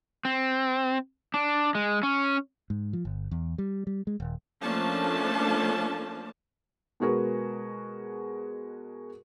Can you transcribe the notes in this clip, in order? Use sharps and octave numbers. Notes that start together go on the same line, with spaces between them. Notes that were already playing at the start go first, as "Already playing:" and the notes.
C4
D4
G#3
C#4
G#2
F3
G1
E2
G3
G3
G#3
D#1
F3 A3 A#3 C#4 D4 A5
B2 G#3 F#4 G#4 A#4 B4